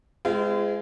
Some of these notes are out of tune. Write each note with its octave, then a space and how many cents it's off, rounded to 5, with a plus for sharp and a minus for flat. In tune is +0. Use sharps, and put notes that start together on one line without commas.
G#3 +0 C4 -40 F4 -35